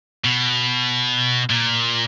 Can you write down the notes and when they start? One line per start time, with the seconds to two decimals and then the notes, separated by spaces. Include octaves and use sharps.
0.24 B2
1.50 A#2